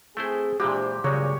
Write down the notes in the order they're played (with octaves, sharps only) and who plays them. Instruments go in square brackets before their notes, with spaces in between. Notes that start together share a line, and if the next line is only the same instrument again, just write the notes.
[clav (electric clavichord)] A3 E4 C5 [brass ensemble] C4 G#4
[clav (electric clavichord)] A#2 E3 G#3 [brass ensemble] D4 E4 C5 [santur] G4
[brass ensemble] G2 A#2 [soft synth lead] C#3 [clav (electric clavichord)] F#3 G#3 [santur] C#5